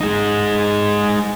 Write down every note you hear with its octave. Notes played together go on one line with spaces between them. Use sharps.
G#3 D#4